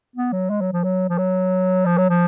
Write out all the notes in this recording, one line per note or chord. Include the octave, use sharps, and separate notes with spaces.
B3
F#3
G#3
F#3
F3
F#3
F3
F#3
F3
F#3
F3